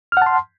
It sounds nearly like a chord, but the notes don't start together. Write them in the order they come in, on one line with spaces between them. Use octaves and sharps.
F6 F#5 A5 C6